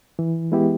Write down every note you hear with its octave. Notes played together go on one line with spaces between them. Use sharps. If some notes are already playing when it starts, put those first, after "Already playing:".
E3
G#3 B3 E4 G4